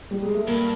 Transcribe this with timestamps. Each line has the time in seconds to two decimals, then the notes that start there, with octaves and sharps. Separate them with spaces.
0.11 G3
0.22 G#3
0.34 A3
0.47 G2 A#3